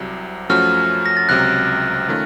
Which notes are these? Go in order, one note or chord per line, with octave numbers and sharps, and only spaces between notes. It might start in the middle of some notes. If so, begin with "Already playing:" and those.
Already playing: C2 C3 F#3
F#2 F3 A3 C#4 F#4 F6
A#6
A6
C#2 C3 F#3 F#6
D#3 A3 C#4 F4